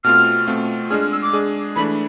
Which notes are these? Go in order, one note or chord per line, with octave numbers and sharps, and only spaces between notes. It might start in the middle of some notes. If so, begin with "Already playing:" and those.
B2 A3 C4 F4 F6
B2 A3 C4 F4
G#3 D4 G#4 F6
F6
E6
D6
G#3 D4 G#4
E3 A3 D4 B5